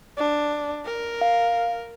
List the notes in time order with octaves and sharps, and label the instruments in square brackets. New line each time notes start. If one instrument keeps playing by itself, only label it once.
[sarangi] D4
A#4
[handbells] F5